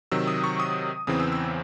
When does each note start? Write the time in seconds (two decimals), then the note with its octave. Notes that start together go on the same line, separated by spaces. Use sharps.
0.12 C3 D#3 F#3 E6
0.27 D#6
0.44 C#6
0.60 D#6
1.07 E2 C#3 E3 C4 D#6
1.20 E6
1.32 E6